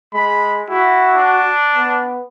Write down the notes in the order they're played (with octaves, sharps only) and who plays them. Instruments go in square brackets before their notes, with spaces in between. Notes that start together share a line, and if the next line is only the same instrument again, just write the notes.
[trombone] G#3 [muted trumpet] B5
[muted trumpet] E4 [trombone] F#4
[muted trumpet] D4
[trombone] B3